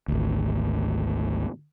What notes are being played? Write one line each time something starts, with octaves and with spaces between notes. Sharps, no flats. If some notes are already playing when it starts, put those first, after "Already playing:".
G#1 D2